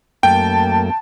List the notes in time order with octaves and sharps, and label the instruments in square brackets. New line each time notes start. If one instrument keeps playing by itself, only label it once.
[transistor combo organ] F#2 A3 A#3 [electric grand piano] G5 [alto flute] A5